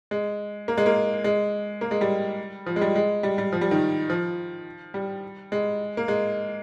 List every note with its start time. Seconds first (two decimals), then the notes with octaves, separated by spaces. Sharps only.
0.11 G#3
0.68 A#3
0.78 G#3
0.86 A#3
1.24 G#3
1.81 A#3
1.91 G#3
2.01 G3
2.66 F3
2.76 G#3
2.81 G3
2.95 G#3
3.23 G3
3.38 G3
3.53 F3
3.61 G3
3.71 D#3
4.10 F3
4.94 G3
5.52 G#3
5.97 A#3
6.08 G#3